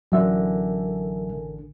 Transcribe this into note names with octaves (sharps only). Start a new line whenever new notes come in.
A1 D3 F#3 A4 A#4 E5 G#5